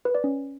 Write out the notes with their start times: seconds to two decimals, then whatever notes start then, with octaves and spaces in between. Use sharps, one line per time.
0.05 B4
0.15 D5
0.24 C#4